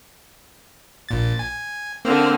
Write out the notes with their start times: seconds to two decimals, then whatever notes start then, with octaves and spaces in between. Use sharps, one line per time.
1.09 A#1 A#2 A6
1.39 G#5
2.05 D3 A#3 C4 F6